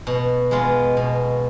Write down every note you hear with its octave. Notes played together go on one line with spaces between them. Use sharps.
B2
G#3 B3 F4
B2